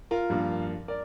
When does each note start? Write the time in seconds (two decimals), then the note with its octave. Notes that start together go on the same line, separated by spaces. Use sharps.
0.11 F4 A#4
0.30 G2 F3 A#3
0.88 A#4 D5